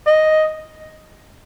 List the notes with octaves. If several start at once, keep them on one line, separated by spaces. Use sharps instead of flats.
D#5